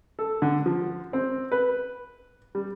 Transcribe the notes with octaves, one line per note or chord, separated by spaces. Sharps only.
A4
D3
F3
C4
B4
G3